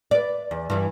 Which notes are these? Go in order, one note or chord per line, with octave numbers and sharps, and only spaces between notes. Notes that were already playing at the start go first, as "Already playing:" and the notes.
B4 D5
E2
G2 E3